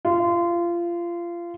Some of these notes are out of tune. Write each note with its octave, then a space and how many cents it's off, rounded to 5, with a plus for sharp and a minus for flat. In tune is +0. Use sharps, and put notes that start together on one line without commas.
F4 -25